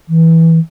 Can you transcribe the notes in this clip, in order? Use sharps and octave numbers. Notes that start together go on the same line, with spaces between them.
E3